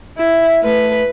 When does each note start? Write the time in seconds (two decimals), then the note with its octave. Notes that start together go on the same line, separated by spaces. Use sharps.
0.18 E4 E5
0.64 A3 B4